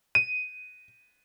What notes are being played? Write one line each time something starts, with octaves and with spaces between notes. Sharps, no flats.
D#7